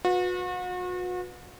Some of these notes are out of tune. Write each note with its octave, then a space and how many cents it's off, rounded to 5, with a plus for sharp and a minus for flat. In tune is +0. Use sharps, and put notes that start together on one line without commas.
F#4 -40 B4 +0